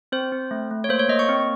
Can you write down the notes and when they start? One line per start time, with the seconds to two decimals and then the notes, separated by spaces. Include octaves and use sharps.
0.12 C4 C5
0.32 C4
0.51 A3
0.71 A3
0.84 C#5
0.89 A#3 C5
0.99 C#5
1.09 A#3 D#5
1.19 C#6
1.29 C4